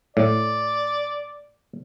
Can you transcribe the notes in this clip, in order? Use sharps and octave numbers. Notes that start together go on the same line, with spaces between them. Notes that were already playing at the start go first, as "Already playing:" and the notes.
A2 D5